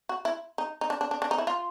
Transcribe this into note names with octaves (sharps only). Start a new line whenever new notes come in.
F#4
E4
D#4
D#4
D4
D4
D4
D4
D#4
E4
F4